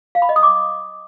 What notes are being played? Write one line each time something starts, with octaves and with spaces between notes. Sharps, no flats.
F5
B5
D#5
D#6
D6